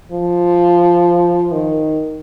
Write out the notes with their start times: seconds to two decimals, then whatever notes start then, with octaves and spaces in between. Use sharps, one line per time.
0.12 F3
1.52 D#3